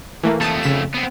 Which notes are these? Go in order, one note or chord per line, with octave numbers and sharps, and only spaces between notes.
E3 A3 A#3
F2 A3 A5 D#6
C#3 B6 E7
B3 C4